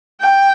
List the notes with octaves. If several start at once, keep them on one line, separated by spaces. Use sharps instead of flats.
G5